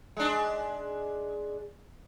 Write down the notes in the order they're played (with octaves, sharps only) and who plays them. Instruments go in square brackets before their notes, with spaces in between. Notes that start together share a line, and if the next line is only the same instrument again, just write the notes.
[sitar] G#3 D4